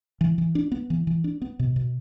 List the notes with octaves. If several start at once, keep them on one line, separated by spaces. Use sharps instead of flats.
E3
E3
D4
B3
E3
E3
D4
B3
B2
B2